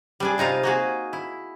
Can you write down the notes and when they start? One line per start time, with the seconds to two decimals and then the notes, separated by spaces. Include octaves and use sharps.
0.20 G3 D4 G#4
0.38 C3 D#4 F4 F5
0.63 A#3 F#4 G#4
1.13 E4